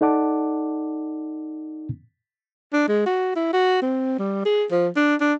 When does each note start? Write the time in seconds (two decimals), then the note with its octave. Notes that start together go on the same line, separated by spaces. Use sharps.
0.01 D#4 A4 D5 F#5 A5 D6
2.73 D4
2.88 G#3
3.06 F#4
3.36 E4
3.53 F#4
3.82 C4
4.19 G3
4.45 G#4
4.71 F3
4.96 D4
5.21 D4